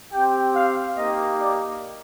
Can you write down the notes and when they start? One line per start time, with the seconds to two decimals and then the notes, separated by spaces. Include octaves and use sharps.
0.11 C4 G4 G5
0.54 F5
0.96 A#3 D#4 G4 D#5
1.39 D5